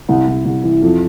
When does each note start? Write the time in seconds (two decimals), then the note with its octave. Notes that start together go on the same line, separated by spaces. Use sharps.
0.09 C2
0.27 C2
0.45 C2
0.63 E3
0.82 F2